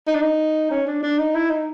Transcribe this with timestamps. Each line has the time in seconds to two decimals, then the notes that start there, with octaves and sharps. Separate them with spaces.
0.07 D#4
0.15 D4
0.22 D#4
0.71 C#4
0.87 D4
1.03 D4
1.19 D#4
1.35 E4
1.50 D#4